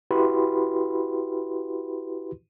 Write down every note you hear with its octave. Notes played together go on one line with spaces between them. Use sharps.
E4 F#4 G4 B4 B5 C6